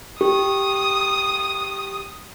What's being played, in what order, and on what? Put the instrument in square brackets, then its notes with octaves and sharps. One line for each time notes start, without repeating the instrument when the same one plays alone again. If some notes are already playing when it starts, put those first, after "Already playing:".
[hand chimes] G4 [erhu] D#6